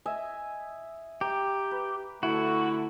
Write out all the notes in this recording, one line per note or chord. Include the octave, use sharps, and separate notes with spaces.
D#5 E5 G#5
G4 A#5 D6
B4
D3 A3 E4 F#4